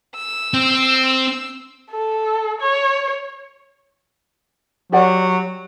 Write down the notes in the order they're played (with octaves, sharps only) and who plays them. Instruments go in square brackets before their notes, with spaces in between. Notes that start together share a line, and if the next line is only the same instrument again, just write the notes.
[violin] E6
[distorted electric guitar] C4
[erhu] A4
C#5
[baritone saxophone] F#3 [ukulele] G4 D5 F#5